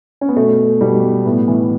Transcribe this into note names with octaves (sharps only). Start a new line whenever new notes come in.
C#4
B3
B2 A3
B2 G3
A2 B3
E3